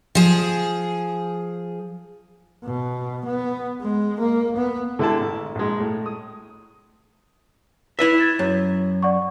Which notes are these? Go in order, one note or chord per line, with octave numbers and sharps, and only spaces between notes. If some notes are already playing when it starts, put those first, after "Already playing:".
F3 G#4
B2
B3
G#3
A#3
B3
D3 G#3 E4 G4 A5
A1
A#1 G#3
A2
D#6
E4 B4 E5
G#6 A6 E7
F#2 C#5
D5 F#5 C#6